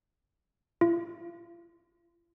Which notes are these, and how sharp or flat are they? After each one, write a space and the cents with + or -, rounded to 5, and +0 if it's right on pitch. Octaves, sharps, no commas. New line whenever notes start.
F4 -40